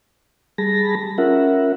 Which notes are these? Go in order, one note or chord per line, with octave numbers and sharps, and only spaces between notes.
G3 G#4 A5 B5 A#6
C#4 F4 A#4 E5 F#5